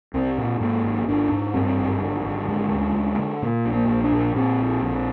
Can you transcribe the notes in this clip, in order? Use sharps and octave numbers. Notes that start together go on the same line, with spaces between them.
C2 C4
A#2
G#2 A#3
G#1
G#1 D4
G#2
G2 C4
G#1
D3
G#1
D3 G#3
D2
D2
D3
A#2 A#3
A#1
A#3
A#1
D4
A#2
A#2 C4
A#1
A#1